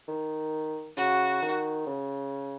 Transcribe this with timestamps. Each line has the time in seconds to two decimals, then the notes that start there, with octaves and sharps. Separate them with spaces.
0.08 D#3
0.97 C#3 F#4
1.42 D#3
1.87 C#3